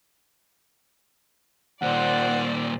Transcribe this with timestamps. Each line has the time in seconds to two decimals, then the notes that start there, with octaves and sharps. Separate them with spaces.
1.82 D#2 A#2 C5 D5 F#5